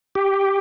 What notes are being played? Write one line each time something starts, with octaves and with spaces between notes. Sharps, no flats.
G4